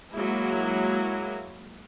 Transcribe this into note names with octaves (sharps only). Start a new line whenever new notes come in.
F#3 G#3 A#3 E4